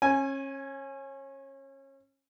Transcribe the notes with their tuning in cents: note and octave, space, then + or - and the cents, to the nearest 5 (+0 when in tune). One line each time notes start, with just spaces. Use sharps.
C#4 -30 G#5 +0